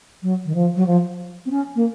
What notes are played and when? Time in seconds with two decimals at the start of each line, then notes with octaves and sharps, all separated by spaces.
0.22 F#3
0.45 D#3
0.54 F3
0.75 F#3
0.86 F3
1.45 C4
1.50 C#4
1.75 A#3